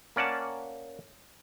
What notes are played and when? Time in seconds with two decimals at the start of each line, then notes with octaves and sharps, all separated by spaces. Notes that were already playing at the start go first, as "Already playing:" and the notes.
0.16 A#3 C#4 D5 F#5 A5